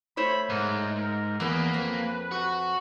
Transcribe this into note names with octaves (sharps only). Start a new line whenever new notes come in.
A3 C5 C#5 B5
G#2 A#4
A#4
E2 A#3 B3 B4
F2
F#4